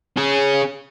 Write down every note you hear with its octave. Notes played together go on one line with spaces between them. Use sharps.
C#4 G#4